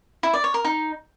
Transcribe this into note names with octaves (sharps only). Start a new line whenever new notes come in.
E4
D5
C#5
A#4
D#4